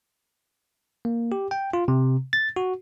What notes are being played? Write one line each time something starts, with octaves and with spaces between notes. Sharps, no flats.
A#3
G4
G5
F4
C3
A6
F#4